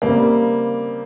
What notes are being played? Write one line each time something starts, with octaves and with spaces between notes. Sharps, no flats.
C#3 G3 A#3 C4